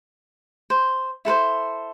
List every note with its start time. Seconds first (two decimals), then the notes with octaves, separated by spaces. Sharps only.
0.70 C5
1.25 E4 A4 B4 C5